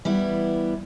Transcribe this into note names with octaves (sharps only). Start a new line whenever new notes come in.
E3 G3 B3 E4